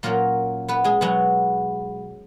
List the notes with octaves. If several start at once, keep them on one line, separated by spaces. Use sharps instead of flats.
A#2 F#3 A#3 C#4 A#4
B3 B4
G#3 G#4
B2 F#3 G#3 B3 F#4